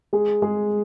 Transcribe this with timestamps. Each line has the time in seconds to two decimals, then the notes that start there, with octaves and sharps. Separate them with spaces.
0.13 G#3 G#4
0.42 G#3 G#4